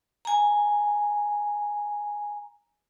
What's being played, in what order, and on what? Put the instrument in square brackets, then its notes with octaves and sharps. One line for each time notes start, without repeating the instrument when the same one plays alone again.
[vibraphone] G#5 A#5